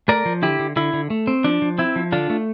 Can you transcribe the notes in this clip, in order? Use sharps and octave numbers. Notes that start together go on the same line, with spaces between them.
A3 A#4 D5
F3
D3 E4 G4
D3
D3 E4
D3
A3
C4
F3 D4
F3
C4 E4
F3
D3 D4 F4
A3